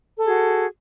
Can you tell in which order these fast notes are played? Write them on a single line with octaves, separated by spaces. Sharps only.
A4 G#4 F#4